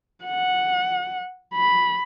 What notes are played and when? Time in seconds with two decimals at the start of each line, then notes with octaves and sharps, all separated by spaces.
0.25 F#5
1.54 B5